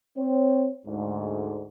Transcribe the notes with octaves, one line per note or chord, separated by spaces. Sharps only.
C4 C#5
D2 G#2